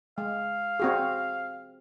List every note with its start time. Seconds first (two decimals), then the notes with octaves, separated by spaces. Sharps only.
0.18 G#3 F5
0.80 C4 F#4 G#4